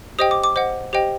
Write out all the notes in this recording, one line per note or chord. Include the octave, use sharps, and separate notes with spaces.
G4 C5 D#5 G5 D#6
D6
D6
C5 D#5 F#5
G4 C5 D#5 G5